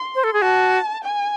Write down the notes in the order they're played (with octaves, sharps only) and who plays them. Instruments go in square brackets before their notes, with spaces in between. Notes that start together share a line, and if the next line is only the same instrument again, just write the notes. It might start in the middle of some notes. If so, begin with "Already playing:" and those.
Already playing: [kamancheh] C6
[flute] C5
A4
G#4
[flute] F#4 [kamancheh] A5
[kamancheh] G#5